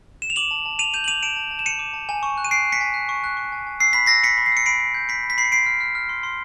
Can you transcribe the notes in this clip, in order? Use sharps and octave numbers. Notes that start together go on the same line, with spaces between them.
E7
F7
D6 E7 F#7
A5
A5
A5 D#7 F7
G6 D#7 F7
F#7
D6 D#7 F7
A5 D7 E7
A5
A5
E7
A5 C#7 D#7
D6
A5
G#5
C#6
F#6
D#7
F#6 C7 D7
F#6
B6 C#7
G#5
F#6
C#6
F#6
C#6
G#5
G#5
E6 C7
B5 B6
E6 A#6 C7
B5 B6 C#7
B5
C7
E6 C#7
B5 C7 D7
B5
G6
B5 B6 C#7
B5
B6
B5 C7
C#7
C6 C7 D7
F6
F6
F6
C6
C6